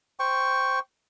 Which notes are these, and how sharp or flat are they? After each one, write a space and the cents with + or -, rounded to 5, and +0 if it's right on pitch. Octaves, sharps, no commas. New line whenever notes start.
C5 -5 G5 +0 C#6 +0